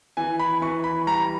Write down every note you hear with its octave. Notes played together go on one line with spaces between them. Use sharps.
E3 G#5
B5
E3 C#6
B5
G3 A#5